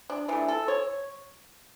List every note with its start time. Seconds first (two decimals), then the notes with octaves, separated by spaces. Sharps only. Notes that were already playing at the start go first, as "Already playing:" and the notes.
0.10 D4
0.28 E3 A3 D4
0.48 A4
0.68 C#5